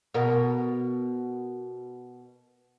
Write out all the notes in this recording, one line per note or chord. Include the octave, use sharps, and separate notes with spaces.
B2 A#4